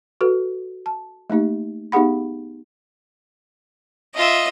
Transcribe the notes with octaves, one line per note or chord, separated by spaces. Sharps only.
F#4 A4 B4
A5
A3 A#3 D#4 G4
B3 D#4 G4 G#4 F#5 B5
F4 D#5 E5